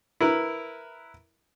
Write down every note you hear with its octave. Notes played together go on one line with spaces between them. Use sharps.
E4 A#4 B4